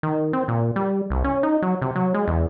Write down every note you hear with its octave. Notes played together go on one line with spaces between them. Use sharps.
D#3
C4
A#2
G3
C2
C#4
D#4
F#3
C3
F#3
G#3
E2